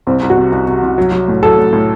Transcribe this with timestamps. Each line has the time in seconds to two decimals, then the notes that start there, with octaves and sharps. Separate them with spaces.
0.07 C2 C4
0.23 C2
0.30 F#4
0.37 C3
0.52 C2
0.67 C3
0.83 C2
0.98 F#3
1.12 F#3
1.28 A2
1.43 F#3 A4
1.58 A2
1.73 A2